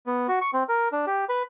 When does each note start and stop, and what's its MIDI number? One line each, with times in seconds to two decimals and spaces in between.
0.06 0.27 59
0.28 0.39 66
0.41 0.51 85
0.53 0.63 60
0.69 0.89 70
0.92 1.06 62
1.07 1.25 67
1.29 1.43 71